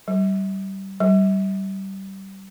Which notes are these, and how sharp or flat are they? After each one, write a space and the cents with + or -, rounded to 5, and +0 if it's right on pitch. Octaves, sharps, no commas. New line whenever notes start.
G3 -20
G3 -20